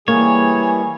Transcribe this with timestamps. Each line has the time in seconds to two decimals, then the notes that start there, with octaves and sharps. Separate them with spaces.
0.08 E3 G3 A#3 G#4 C#5